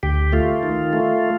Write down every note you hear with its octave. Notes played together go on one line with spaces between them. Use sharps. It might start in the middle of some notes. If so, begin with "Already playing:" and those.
D2 G4
A3 F4
D#3
A3